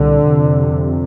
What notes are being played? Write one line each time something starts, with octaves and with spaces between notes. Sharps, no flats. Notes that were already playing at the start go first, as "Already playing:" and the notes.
Already playing: C2 A#2 D3
F2 C3